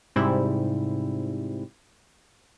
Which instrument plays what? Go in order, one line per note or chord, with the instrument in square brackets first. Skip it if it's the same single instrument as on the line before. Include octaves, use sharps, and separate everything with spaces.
[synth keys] G#2 C3 G3 E4